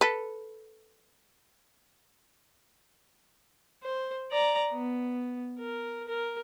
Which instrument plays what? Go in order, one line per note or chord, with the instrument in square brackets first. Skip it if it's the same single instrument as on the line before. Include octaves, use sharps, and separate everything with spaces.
[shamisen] A4 B4
[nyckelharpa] C5
D5 A#5
B3
A#4
A#4